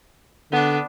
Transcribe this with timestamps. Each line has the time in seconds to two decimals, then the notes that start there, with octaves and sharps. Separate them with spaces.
0.52 D3 B3 D4